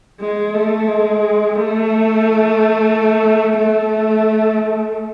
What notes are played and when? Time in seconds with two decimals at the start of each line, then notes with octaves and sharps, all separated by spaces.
0.21 G#3
0.55 A3
0.88 G#3
1.55 A3
3.57 A3